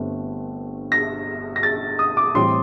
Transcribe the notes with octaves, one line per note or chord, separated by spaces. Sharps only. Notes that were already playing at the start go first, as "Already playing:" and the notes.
Already playing: G1 G2 D3 A3 C4
A#6
A#6
A6
D#6
D6
A1 A2 G3 C4 C6